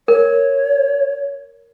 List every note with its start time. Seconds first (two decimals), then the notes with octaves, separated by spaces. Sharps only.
0.08 A#4 C#5